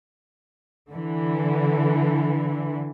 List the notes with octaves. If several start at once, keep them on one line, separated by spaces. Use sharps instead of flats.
D3 E3